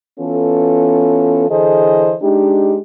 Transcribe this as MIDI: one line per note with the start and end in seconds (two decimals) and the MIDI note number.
0.19 1.49 52
0.19 1.49 59
0.19 1.49 61
0.19 1.49 65
0.19 1.49 69
1.50 2.14 50
1.50 2.14 52
1.50 2.14 68
1.50 2.14 69
1.50 2.14 72
1.50 2.14 75
2.22 2.78 56
2.22 2.78 62
2.22 2.78 63
2.22 2.78 67